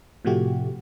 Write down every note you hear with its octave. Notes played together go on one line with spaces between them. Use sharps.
A2 C3 F3 A3 F#4 G4